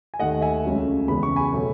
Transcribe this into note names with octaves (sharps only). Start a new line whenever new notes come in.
G#5
D#2 D#3 A3 D#5 F#5
E5 G#5
C#2 C#3 F#3 A3
E2 C#3 G#3 B3 B5
C#6
G#5 B5
B2 F#3 A3